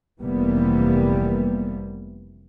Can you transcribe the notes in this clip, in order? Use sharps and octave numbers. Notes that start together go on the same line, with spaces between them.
F1 C3 E3 G3 A#3 B3